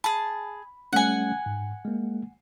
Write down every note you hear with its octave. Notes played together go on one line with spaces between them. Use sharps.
G#4 A5 B5
G3 A3 C#4 F#5 G#5
G#2
G#3 A#3